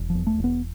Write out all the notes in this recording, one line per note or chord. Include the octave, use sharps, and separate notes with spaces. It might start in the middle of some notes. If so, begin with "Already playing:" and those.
Already playing: E1
F3
E2
A3
E1
B3